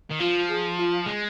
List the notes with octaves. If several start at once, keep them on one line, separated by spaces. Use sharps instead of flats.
D#3
F3 F4
G#4
F4
G#3